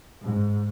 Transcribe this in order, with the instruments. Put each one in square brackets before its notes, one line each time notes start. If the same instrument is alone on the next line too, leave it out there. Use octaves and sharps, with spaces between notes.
[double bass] G#2